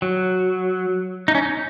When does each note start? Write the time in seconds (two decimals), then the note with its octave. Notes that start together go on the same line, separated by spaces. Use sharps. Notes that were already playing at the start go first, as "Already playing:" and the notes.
0.02 F#3
1.28 D#4
1.35 C#4
1.42 D#4